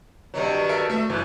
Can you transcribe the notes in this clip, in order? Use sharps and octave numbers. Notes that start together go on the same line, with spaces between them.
G2 D#3 F#3
A4 A#4 E5
A3 E5
G1 E3 F#6